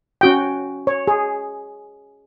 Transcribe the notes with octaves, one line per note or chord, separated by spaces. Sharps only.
C#4 F#4 G5
C#5
G#4